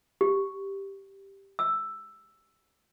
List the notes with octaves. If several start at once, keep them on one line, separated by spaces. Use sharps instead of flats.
G4
E6